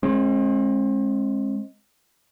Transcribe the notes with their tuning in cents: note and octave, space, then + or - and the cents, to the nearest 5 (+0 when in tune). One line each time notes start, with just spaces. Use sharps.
G#3 +10 C4 +45